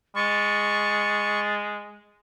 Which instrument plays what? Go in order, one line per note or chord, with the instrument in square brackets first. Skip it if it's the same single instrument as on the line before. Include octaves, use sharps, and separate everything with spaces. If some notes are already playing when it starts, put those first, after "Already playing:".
[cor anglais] G#3 [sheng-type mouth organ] C#6 [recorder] A6